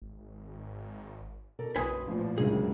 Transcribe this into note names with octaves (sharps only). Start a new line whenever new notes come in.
G#1
B2 A4 A#4
F#1 B1 B4 G#5 C6 D#6
A1 A#2 F3
F#1 C#2 G2 C3 G#4